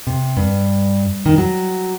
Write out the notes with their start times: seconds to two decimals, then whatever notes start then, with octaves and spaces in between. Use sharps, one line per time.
0.07 C3
0.37 G2
1.26 D#3
1.38 F#3